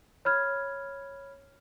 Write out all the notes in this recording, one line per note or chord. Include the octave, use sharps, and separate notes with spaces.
C#5 B5 F6 G#6